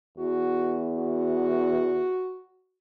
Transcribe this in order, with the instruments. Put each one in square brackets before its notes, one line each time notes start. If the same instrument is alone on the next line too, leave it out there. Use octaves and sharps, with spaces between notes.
[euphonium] E2 [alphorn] F#4
[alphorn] F#4